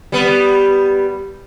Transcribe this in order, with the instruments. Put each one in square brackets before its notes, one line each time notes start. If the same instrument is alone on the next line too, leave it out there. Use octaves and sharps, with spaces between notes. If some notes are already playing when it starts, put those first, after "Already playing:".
[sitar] G3 B3